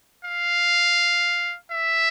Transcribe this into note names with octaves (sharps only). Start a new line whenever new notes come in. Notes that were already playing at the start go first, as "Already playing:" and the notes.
F5
E5